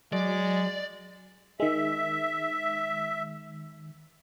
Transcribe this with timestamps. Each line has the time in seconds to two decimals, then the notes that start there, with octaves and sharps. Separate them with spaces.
0.13 F#3 G#3 D5
1.60 D#3 G#3 E5